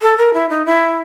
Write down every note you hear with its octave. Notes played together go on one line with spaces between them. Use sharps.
A4
A#4
E4
D#4
E4